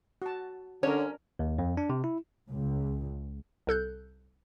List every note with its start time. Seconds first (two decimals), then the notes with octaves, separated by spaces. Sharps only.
0.22 F#4 A5
0.83 D3 C#4 D4 A#4 C#5
1.39 D#2
1.59 F2
1.77 D4
1.90 C3
2.04 E4
2.49 C#2
3.67 C2 A4 F#6 G6